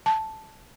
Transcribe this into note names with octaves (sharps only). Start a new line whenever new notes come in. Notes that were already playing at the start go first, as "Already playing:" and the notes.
A5